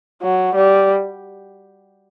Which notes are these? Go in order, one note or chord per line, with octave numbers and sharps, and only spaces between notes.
F#3
G3